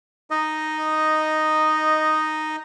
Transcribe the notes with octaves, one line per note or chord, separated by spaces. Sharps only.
D#4 D#5